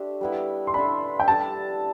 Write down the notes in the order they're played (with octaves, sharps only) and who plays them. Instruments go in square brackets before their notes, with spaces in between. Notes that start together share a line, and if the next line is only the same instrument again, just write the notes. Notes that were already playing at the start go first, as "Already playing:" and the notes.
Already playing: [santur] A3 D4 G4 C5
G3 B3 E4
[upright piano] C6
[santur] D4 A4 E5 [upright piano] B5
[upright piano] G5
[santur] G3 D4 A4 D5 [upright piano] A5